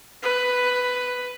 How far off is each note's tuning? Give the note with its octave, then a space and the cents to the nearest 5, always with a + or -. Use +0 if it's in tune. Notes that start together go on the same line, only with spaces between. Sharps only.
B4 +5